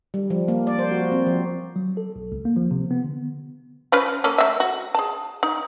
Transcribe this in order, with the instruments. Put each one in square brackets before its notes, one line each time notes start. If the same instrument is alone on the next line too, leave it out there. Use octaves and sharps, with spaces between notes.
[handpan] G3
F3
A#3
D5
C5
F#4
C4
F3
[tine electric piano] F#3
A4
B1
C#2
A#3
F3
C3
B3
D3
[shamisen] F3 C#4 B4
A#3 C#4 A4
A3 E5
F#4
G#4 A5
D#4